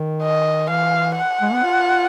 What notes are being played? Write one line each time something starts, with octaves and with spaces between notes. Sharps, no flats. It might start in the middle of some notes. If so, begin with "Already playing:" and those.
Already playing: D#3
D#5
E3 F5
F#5
G#3
B3
F4